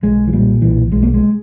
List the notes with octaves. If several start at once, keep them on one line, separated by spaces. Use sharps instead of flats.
B1 G#3
E3
A#2 G3
B1 E3
B1 G#3
A#3
G#3